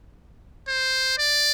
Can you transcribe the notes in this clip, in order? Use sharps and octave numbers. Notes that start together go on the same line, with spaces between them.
C5
D5